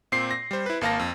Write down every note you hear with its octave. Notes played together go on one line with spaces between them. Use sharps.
A#2 C4 C7
A#6
G3 C5
E4 B4
G#1 A#3 F5 A5 A#6
F2